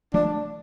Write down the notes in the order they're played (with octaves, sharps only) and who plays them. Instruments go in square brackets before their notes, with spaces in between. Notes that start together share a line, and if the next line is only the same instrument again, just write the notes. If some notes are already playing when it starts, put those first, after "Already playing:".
[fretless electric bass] F3 A3 [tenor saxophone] D4